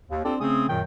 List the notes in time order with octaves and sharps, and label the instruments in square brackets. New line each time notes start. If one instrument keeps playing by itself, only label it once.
[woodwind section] D#2
C4 D4 F4 G4 A4 D5
C#3 A3 C4 C#4 G#4 D#6
F#2 A#2 D#3 F#3 G5